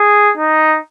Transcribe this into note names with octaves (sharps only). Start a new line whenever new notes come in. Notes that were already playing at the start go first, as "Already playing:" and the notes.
Already playing: G#4
D#4